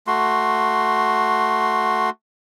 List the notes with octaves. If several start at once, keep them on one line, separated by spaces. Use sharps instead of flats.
A3 F#4 C6